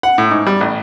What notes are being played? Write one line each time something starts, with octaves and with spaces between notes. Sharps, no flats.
F#5
A2
G#2
G3
A1